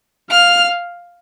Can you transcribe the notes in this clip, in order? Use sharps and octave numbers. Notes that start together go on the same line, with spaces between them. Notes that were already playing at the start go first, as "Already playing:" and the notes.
F5 F6